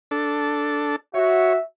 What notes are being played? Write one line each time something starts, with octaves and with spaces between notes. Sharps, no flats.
D4 A4
F#4 C#5 E5